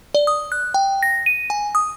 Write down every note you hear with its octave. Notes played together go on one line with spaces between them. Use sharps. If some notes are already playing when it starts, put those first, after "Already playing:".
D5
D#6
F#6
G5
A#6
D#7
G#5
D#6